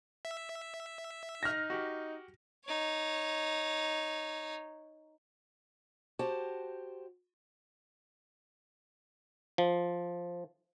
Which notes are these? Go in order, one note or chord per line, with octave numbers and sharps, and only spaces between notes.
E5
D#4 F6 A#6
F#4 G4
D#4 C#5
F#4 G4 C5 A5
F3